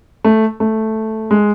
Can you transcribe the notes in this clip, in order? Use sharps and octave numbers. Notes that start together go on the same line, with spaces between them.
A3
A3
G#3